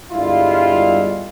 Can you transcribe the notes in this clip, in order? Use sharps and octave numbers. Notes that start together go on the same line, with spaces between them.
G1 G2 G3 G#3 E4 F4